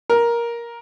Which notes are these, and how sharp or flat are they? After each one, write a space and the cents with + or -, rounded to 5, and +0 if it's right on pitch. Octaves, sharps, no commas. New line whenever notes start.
A#4 +10